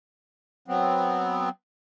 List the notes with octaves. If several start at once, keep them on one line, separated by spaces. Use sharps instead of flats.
F#3 B3 C4